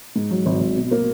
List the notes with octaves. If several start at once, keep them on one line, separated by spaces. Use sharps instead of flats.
G#2
F#3
G#1
G#1
B2
A#3